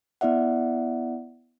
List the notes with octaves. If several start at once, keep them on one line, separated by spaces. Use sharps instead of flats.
B3 E4 D5 E5 F#5